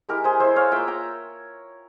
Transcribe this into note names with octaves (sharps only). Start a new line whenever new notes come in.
G#3 E4 G4 A#4
G#4 C5
G#3 E4 C5 E5
C#5 F5
A#3 F4 E5 G5
G5 A#5